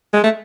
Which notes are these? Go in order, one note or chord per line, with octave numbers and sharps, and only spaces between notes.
G#3
A3